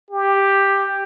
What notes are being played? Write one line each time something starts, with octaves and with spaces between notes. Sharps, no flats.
G4